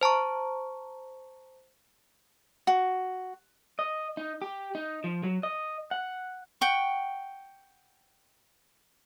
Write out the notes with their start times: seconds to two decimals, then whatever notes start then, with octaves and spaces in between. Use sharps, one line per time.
0.01 C5 A5 A#5 C#6
2.67 F#4
3.79 D#5
4.17 D#4
4.42 G4
4.75 D#4
5.04 F3
5.23 F#3
5.43 D#5
5.91 F#5
6.61 F#5 G5 C#6